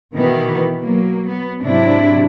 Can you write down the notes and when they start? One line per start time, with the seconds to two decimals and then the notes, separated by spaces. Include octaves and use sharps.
0.13 B2 D#3 E3 B3
0.82 F#3 A#3
1.28 B3
1.62 G#2 C3 F#3 D4 E4